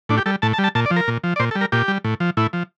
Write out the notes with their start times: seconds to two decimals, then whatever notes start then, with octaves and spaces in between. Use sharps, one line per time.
0.09 A2 D4
0.18 G4
0.26 G3 A4
0.42 A2 A5
0.53 A5
0.58 G3
0.64 A5
0.75 A#2 A5
0.86 D5
0.91 F3
0.96 A#4
1.08 A#2
1.24 F3
1.36 D5
1.40 A#2 C5
1.51 A4
1.55 G3
1.61 A#4
1.72 A#2 G4
1.88 G3
2.04 A2
2.20 F3
2.37 A2 E4
2.53 F3